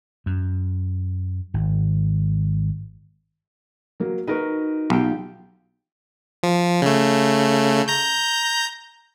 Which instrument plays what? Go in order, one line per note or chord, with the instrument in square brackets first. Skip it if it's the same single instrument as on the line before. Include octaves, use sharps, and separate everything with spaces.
[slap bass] F#2
G#1
[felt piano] F#3 A#3
[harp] D#4 F#4 [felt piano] A#4 B4
[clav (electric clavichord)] B1 [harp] F4 G4
[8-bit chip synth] F3
C#3 A3
A#5 G6